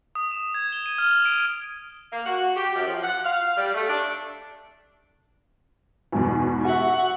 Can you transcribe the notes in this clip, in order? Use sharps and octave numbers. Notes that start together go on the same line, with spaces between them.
D#6
E7
G#6
G7
D#7
F6
F7
D7
A#3
F#4
G4
F#2
F3
F#5
F5
G3
A3
D4
E2 G#2 B2
F#4 E5 F#5 C#6